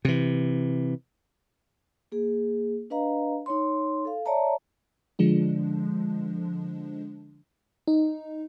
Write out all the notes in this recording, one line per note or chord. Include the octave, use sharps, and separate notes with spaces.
C3 E3
A#3 G#4
D4 B4 D#5 F5 A#5
D#4 C#5 C6
A4 F5
C#5 D5 E5 A5 A#5
D3 F3 G#3 D4
D#4